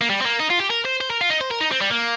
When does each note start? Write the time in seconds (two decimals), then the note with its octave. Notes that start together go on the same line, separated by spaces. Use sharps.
0.01 A#3
0.10 G3
0.21 C4
0.26 A#3
0.40 D#4
0.51 F4
0.60 G4
0.71 A#4
0.85 C5
1.01 C5
1.10 A#4
1.21 F4
1.30 D#4
1.41 C5
1.51 A#4
1.61 D#4
1.72 C4
1.81 G3
1.91 A#3